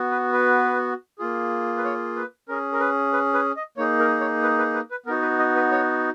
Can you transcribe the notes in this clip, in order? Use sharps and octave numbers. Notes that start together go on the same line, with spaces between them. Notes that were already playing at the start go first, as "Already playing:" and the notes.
Already playing: B3 F#4
B4
B4
A#3 F4 G#4
B4
C#5
B4
C#4 G#4 A#4
A#4
B4
B4
B4
D#5
A#3 D#4 G#4 C#5
A#4
C#5
B4
B4
B4
B4
B3 D#4 F#4 A#4
B4
D#5
B4
C#5